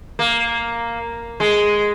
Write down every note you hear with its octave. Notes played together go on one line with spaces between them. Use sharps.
A#3
G#3